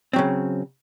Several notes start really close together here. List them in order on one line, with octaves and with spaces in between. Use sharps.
C4 F#3 C#3